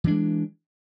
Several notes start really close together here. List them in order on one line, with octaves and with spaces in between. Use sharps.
E3 D4 G#3